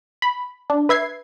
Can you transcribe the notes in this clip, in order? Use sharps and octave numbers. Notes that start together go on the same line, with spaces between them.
B5
D4
B4 E5 G#6 C7